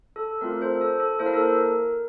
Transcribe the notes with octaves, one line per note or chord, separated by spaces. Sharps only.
A4
A3 C4 F4 A#4
A4 C5
A4
A4
A#3 E4 A4 C5
A#4
A4
A#4